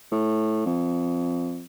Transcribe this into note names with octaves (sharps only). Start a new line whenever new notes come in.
A2
F2